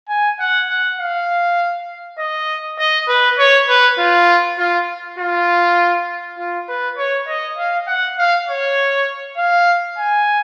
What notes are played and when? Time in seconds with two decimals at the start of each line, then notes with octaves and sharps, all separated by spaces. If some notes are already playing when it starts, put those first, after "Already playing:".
0.09 G#5
0.39 F#5
0.70 F#5
1.00 F5
2.19 D#5
2.79 D#5
3.08 B4
3.39 C#5
3.69 B4
3.99 F4
4.59 F4
5.19 F4
6.38 F4
6.68 B4
6.98 C#5
7.28 D#5
7.58 F5
7.87 F#5
8.18 F5
8.48 C#5
9.37 F5
9.98 G#5